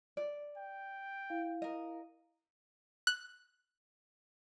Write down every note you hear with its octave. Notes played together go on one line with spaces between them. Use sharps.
D5
G5
E4 F5
A#4 D#5
F#6